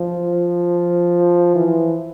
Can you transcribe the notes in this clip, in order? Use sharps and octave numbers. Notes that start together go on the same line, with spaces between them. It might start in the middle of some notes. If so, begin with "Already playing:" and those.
Already playing: F3
E3